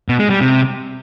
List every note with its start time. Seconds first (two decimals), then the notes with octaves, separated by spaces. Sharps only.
0.09 B2
0.19 G#3
0.30 G3
0.41 C3